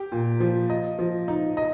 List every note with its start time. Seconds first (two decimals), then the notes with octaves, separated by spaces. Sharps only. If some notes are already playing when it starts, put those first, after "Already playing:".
Already playing: G4
0.12 A#2
0.40 F3
0.70 D#5
0.99 F3
1.28 D#4
1.57 D#5